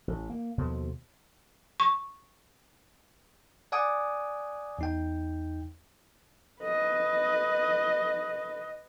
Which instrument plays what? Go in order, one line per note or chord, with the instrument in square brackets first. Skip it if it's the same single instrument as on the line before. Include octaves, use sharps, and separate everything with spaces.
[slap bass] A1
A#3
D#2 B2 D3 F3
[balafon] C#6
[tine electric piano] D5 F#5 G#5 D6 D#6
E2 D#4 G5
[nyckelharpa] B4 [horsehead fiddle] D#5